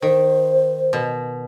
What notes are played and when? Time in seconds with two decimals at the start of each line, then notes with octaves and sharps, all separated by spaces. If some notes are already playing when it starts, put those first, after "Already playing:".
0.02 D#3 C5
0.93 B2